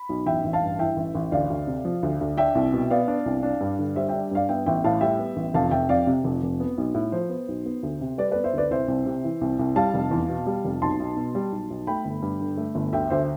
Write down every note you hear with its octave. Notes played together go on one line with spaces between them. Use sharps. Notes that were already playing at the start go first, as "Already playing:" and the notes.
Already playing: B5
B1
A1 E5 G5
A1
F5 A5
G2
E3 E5 G5
A1
A1
D2 D5 F5
D2
C3
F3
D2
D2
D4 E5 G5
C2
B2
B3 D5 F5
D4
C2
D4
G2
D3
G3 C5 E5
D4 E5 G5
G2 D5 F5
B3 E5 G5
A1 E5 G5
A2 F5 A5
G3 E5 G5
B3
A1
F1 F5 A5
F1 E5 G5
F2 D5 F5
C3
F1
F1
B3
B1
A2
F3 C5
B3
B1
B3
D2
C3
G3 B4 D5
B3 B4 D5
C5 E5
D2 B4 D5
C2 C5 E5
C2
C3
E3
C2
C2
G3 F5 A5
F1
E2
B2
G3
F1
B1 A5 C6
B1
B2
G3
B1
B1
A3 G5 B5
G1
G2
D3
A3
G1
D2 E5 G5
D2 C5 E5